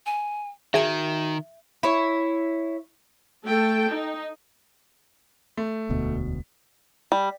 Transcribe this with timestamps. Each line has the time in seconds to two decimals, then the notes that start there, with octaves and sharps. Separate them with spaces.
0.06 G#5
0.74 D#3 F#4 G#4 E5 G#6
1.83 E4 C#5
3.45 A3 A4 G5
3.90 D#4
5.57 A3
5.89 E1 D2 B2
7.12 G3